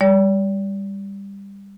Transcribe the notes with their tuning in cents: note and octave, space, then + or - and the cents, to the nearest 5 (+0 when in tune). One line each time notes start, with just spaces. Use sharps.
G3 +20 D5 -40